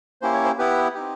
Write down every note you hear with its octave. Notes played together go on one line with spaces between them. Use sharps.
A#3 C#4 E4 G4 C5
C#5
C5
B3 E4 G4 B4
C4 D#4 G4